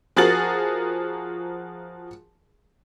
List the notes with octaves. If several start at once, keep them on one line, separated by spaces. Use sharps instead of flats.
F3 F#4 G#4 A#4 A6 F#7